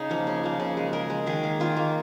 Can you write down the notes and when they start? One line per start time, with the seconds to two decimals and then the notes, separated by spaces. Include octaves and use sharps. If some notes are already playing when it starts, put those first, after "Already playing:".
Already playing: C#3 D#4
0.10 F3 A#3
0.27 C#3
0.43 F3 A#3
0.60 C#3
0.77 G#3
0.93 C#3 A#4
1.10 G#3
1.26 D#3 G#4
1.44 A#3
1.60 D#3 F4
1.76 A#3